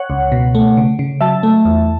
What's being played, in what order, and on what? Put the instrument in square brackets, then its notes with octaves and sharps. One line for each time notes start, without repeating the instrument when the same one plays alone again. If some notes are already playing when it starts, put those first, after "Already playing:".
Already playing: [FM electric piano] C#5 F#5
C#2
B2
A3
C#3
C#3
F#3 E5 A5
A3
E2